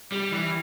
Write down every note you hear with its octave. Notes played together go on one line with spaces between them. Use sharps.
G3
E3